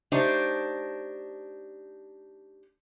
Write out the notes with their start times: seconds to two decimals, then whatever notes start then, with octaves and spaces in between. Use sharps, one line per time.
0.12 A3 D4 D#4 G4 C5